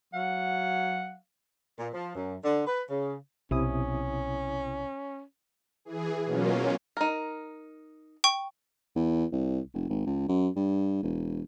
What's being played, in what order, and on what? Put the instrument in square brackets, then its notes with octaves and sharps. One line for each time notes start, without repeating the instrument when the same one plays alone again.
[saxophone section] F#3 F5 F#5
A#2
F3
F#2
D3
B4
C#3
[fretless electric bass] B1 [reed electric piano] C3 E4 D#6 [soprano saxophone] C#4
[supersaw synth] E3 G#4
B2 F#3 A#3 C#4 F4
[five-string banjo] D#4 A#4
[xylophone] G5 C#6
[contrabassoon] E2
C2
F1
G#1
C#2
F#2
G2
E1